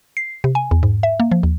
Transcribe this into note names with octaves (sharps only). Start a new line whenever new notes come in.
C7
C3
G#5
E2
G#2
E5
A#3
F3
D#2